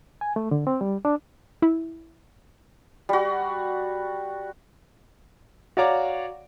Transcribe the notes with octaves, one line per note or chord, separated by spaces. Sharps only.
G#5
A3
D3
C4
G3
D4
E4
G3 F#4
F#4 C#5 D5 F5 A#5 D6